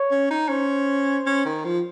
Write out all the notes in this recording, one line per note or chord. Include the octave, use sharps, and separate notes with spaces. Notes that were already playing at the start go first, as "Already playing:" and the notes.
Already playing: C#5
C#4
D#4
C#4 C5
C#4
D#3
F3